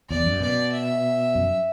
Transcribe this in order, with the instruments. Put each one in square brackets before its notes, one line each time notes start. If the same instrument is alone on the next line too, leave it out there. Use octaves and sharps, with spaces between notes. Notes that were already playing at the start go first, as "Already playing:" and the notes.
[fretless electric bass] E2 [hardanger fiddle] D5
[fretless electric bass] F#2
[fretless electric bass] B2 [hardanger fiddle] D5
[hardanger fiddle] E5
[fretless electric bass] F#2